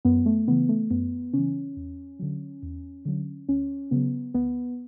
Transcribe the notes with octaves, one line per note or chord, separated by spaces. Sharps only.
F#2 B3
A3
C#3 E3 B3
A3
F#2 B3
C#3 E3 C#4
E2
D3 F#3
E2
D3 F#3
D2 C#4
C#3 F#3 B3
D2 B3